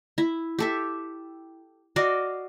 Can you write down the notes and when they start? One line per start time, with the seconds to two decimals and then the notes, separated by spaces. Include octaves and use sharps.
0.18 E4
0.59 G4 A4 E5
1.96 F#4 D5 D#5 F5